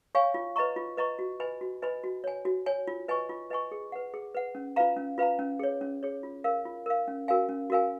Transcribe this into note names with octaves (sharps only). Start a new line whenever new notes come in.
C#5 F5 G#5 C#6
F4
B4 D#5 A#5 C#6
F4
B4 D#5 A#5 C#6
F#4
B4 D#5 G#5 B5
F#4
B4 D#5 G#5 B5
F#4
C#5 G#5
F#4
C#5 G#5
F4
B4 D#5 G#5 C#6
F4
B4 D#5 G#5 C#6
G#4
B4 F#5
G#4
B4 F#5
C#4
F4 B4 F5 A#5
C#4
F4 B4 F5 A#5
C#4
G#4 C#5
C#4
G#4 C#5
F4
A#4 F5
F4
A#4 F5
C#4
F#4 A#4 F5 G#5
C#4
F#4 A#4 F5 G#5